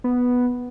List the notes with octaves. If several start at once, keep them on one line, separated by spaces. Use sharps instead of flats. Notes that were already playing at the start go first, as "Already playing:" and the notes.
B3